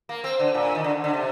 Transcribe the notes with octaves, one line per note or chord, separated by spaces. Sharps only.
A#3
C4
D3
A#2
D#3
D3
D3
C3